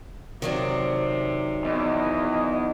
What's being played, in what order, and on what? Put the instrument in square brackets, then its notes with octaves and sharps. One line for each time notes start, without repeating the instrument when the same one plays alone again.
[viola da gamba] C3 [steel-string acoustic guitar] D#3 F#3 D4
[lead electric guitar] E2 [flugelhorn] D#5